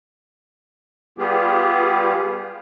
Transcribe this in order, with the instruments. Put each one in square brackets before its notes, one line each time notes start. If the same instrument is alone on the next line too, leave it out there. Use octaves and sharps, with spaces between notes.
[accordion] G3 B3 F4 G4 G#4